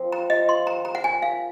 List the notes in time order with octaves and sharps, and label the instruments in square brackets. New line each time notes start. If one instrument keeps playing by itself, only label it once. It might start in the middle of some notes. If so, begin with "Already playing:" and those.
Already playing: [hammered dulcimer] F3 C4
[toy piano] A#5
[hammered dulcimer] F4
[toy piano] D#5
[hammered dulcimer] F4
[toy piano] C6
[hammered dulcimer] D#3 [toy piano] A#5
[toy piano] A#5
[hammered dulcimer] F4 [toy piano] F#5
[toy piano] G#5
[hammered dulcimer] F4
[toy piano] F5